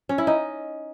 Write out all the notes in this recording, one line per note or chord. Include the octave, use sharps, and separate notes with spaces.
C#4
E4
D#4